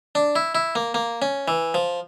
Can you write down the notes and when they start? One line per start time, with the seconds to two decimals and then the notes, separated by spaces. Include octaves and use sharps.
0.15 D4
0.36 E4
0.55 E4
0.75 A#3
0.94 A#3
1.22 C#4
1.48 E3
1.74 F3